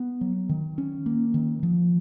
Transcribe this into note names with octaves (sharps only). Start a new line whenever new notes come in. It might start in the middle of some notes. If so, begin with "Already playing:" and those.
Already playing: B3
F#3
D#3
C#4
A#3
D#3
F3